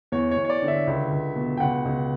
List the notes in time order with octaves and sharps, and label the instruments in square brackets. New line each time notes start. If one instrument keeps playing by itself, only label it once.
[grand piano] E2 C#5
C#5
E2
C#5
D5
D3
E5
C#2
C#2
B2
G5
C#2 F#5
C#2